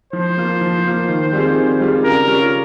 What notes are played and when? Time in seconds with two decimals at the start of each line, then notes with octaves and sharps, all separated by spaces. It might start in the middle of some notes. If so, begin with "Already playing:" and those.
0.13 F3 C5
0.37 A#3 F4
0.61 F3
0.85 A#3 F4
1.08 D#3
1.33 G3 C4 F4 G#4
1.56 D#3
1.80 G3 C4 F4 G#4
2.04 C#3 A#4
2.28 G3 C#4 F4